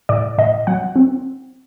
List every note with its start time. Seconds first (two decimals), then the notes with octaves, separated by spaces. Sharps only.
0.09 A2 D5
0.38 A2 D#5
0.67 F#3 F#5
0.96 C4